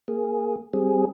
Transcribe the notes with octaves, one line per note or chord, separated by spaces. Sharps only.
A#3 G#4
G3 C4 G#4